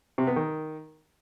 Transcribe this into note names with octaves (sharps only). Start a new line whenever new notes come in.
C3
B3
D#3